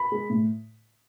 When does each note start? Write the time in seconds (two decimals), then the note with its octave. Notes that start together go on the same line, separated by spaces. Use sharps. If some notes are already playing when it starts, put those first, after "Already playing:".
Already playing: B5
0.12 G#3
0.30 A2